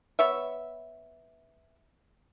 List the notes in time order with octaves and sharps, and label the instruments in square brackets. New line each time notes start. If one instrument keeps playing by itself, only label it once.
[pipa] B3 C#5 E5